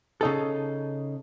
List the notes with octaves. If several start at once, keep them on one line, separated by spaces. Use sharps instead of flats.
C#3 D#4 A4